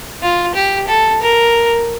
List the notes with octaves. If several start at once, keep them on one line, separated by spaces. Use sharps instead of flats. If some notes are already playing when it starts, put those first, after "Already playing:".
F4
G4
A4
A#4